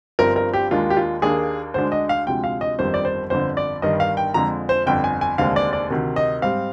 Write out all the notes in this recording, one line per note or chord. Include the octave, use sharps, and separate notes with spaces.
G1 G2 F3 C4 A#4
A#4
G4
D#2 D#3 G#3 D4 F4
G4
F4
D#2 D#3 A#3 D4 G#4
D2 D3 G#3 D4 C5
D#5
F5
D2 C3 F3 G#3 G5
F5
D#5
G1 F2 D#3 G3 C5
D5
C5
G1 F2 D3 C5
D5
G1 G2 D#3 G3 D#5
F5
G5
F2 D3 F3 G#3 A#5
C5
G1 F2 D3 G5
G#5
G#5
F1 D#2 D3 G#3 C4 F5
D5
D5
D2 C3 D#3
D#5
G#2 G3 C4 F5